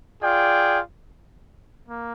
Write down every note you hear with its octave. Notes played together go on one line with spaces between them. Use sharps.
F4 G#4 D5 G5
A#3